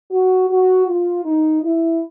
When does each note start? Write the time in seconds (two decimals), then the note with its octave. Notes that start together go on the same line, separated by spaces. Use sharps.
0.11 F#4
0.49 F#4
0.87 F4
1.24 D#4
1.62 E4